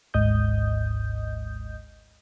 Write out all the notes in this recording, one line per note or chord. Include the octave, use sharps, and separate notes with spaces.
G#1 D2 G#2 D#5 D#6 G6